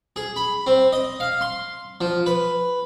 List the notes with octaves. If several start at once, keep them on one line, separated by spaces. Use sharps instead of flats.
G#4
B5
C4
D#5
F5
C6
F3
B4